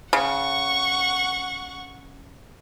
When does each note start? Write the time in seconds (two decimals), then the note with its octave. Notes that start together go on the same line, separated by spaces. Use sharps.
0.13 C#3 F#5 C#6